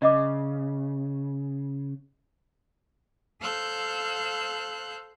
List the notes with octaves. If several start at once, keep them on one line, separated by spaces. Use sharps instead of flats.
C#3 D5 D#5 D6
A4 C5 F5 E6 F#6 G6